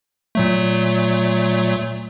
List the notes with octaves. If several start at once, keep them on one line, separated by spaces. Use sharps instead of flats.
A#2 F#3 A3